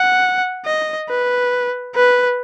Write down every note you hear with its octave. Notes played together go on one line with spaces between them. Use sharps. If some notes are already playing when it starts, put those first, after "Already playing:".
Already playing: F#5
D#5
B4
B4